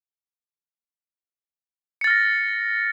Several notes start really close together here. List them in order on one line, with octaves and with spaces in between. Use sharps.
C#7 A6 F6 A#6